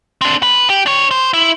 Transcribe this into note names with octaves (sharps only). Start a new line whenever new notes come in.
C4 D4
B4
G4
D4 C#5
C5
E4